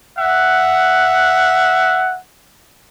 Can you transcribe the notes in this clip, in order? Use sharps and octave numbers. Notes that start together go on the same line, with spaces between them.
E5 F#5